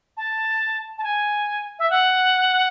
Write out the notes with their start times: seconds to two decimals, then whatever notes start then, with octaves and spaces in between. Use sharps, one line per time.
0.17 A5
0.98 A5
1.04 G#5
1.79 E5
1.90 F#5